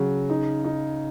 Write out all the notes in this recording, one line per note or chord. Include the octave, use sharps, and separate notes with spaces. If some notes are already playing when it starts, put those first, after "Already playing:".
Already playing: C#3 F#3
D#4
D#4